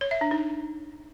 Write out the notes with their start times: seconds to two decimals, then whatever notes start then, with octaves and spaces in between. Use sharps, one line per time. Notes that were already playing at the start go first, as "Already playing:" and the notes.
0.01 C#5
0.11 E5
0.21 D4
0.31 D#4